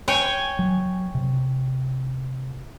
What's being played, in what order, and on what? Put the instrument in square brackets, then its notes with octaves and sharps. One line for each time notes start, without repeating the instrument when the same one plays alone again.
[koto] C#5 G5 G#5
[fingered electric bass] F#3
C3